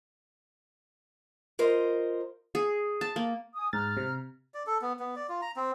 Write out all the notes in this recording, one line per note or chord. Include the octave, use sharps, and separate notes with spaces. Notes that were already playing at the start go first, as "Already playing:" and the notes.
F4 A#4 C5 D#5
G#4
A5
A#3
G#5 D#6
G#2 A#5 F6 A6
C3
D5
A4
B3
B3
D5
F4
A#5
C4